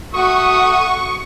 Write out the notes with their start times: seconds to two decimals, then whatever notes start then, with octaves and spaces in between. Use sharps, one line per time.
0.14 A3 F#4 C#6 D#6